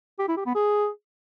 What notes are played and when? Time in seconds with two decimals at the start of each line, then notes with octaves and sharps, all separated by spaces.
0.19 G4
0.28 E4
0.37 G4
0.46 B3
0.55 G#4